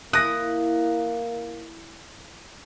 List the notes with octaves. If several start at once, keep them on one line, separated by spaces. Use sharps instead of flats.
A#3 E4 D#6 F#6 A#6